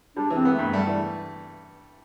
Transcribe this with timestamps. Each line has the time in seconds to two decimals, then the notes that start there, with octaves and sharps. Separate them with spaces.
0.16 G3 D4
0.30 E3
0.36 C4
0.45 B3
0.54 G2 A3
0.72 G3 A3
0.87 E3